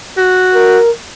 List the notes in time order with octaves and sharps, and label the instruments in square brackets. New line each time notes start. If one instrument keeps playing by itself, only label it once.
[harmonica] F#4
[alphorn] A#4